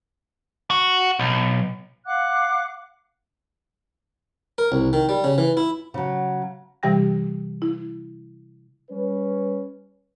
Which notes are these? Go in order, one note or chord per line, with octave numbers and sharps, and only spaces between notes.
F#4
B1
F5 F#5 D6 F#6
A#4
C2
D#3
G3
C#3
E3
E4
C#3 F#3
C3 E3 G3 G4 G5 A#6
E4
G3 C#4 B4